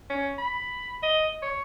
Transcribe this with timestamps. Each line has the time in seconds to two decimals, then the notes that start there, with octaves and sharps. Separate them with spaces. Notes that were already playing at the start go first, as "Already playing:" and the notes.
0.10 C#4
0.38 B5
1.03 D#5
1.42 C#5